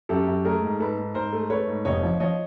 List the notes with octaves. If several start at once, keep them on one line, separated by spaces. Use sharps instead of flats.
F#2 G4 A4
F#2
A3 G#4 A#4
G#2
G#2 A4 B4
G#2
G#2 A#4 C5
A3
A3 B4 C#5
G#2
F1 C#5 D#5
F3
F3 C#5 D#5